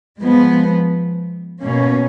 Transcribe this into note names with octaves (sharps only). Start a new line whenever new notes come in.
F3 G#3 B3
B2 A#3 C#4